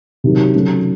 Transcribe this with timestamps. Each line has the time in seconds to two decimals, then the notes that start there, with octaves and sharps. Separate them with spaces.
0.24 C3 D#3 F#3
0.54 C#3 F#3 A3 C#4